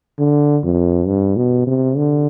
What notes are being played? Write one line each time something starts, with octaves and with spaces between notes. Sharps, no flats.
D3
F2
G2
B2
C3
D3